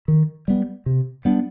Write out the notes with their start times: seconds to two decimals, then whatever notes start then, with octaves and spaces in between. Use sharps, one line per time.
0.08 D#3
0.48 G3 B3
0.86 C3
1.25 G3 B3 D4